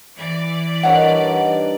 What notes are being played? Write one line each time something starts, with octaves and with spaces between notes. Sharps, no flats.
E3 D5
G2 D#3 C#5 F#5